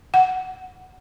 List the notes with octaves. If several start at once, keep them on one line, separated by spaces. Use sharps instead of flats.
F#5